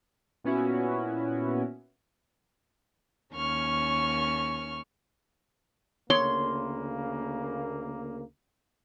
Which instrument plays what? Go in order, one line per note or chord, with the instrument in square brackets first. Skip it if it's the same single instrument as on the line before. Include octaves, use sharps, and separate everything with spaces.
[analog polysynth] A#2 B3 C#4 E4 F#4
[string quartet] D#2 C#4 C#6 F6
[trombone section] D2 C#3 A#3 [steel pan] C#5 [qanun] C6